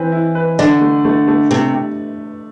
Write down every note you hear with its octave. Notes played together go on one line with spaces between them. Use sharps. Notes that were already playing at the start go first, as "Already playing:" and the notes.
Already playing: E3 C4 B4
E4
B4
D3 D5
A3
A3
A3
C3 A3